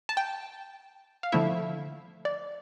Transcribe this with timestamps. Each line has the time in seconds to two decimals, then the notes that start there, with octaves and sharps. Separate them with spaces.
0.09 A5
0.17 G5
1.23 F5
1.32 D3 F3 A3 E4 E5
2.25 D5